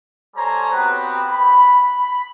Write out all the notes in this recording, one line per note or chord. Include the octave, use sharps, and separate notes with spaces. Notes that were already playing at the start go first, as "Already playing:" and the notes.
G3 A4 C5 C#5 G#5 A#5
B3 C4 F#4 G4 B4
B5
B5